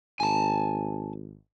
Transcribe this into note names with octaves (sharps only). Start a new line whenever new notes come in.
G#1 G#5 A5